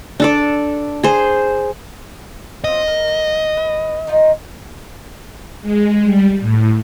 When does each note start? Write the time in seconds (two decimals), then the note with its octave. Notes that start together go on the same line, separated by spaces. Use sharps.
0.20 D4 A4 D5
1.03 G#4 C5
2.64 C4 C#4 F4 D#5
2.88 A#4
3.08 A#3
3.57 B4
4.07 D#3 D#4 F4
5.62 G#3
6.04 G3
6.40 A2